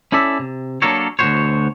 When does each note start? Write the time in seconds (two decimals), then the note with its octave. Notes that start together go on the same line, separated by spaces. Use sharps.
0.12 C#4 E4 A4 D5 E5
0.39 C3
0.82 F#3 A#3 D4 A4 A#4 C#5
1.19 D2 B2 E3 F#4 C5 C#5